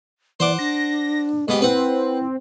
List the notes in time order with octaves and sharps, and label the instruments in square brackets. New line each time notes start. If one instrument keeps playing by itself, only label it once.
[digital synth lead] E3 [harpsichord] C5 F#5 D6 [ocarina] D5
[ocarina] D4 [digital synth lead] A#6
[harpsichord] G#2 B3 G4 [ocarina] D#5
[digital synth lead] C4 [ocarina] E4 [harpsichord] B4 F#5